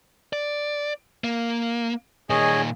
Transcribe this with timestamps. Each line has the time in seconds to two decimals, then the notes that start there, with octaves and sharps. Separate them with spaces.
0.33 D5
1.24 A#3
2.30 A#2 D#3 G#4 C#5 D#5